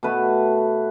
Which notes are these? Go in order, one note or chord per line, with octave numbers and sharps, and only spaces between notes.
B2 A3 B4 A5